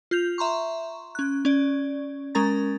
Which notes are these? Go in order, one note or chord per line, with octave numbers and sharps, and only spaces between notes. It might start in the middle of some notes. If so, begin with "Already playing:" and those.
F4 G6 F7
E5 A#5 C6 C#6
C#4 F#6
C#4 D5
G#3 C#4 A#4 A#5 A6